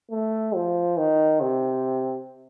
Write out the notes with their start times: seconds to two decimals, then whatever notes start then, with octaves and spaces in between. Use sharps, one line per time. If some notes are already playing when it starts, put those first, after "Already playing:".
0.11 A3
0.55 F3
0.97 D#3
1.41 C3